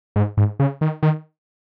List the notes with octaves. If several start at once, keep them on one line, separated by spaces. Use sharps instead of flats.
G#2
G#2
C#3
D#3
D#3